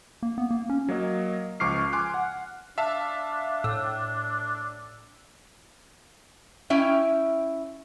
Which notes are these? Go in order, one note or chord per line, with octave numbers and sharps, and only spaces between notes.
A#3
B3
A#3
C#4
F#3 A#3 D#5
C#2 F3 C#6 D6 F6 C7
G#5 C6 D6 F#6
F#5
D4 E5 F5 A5
A2 E6
C#4 E4 E5 G5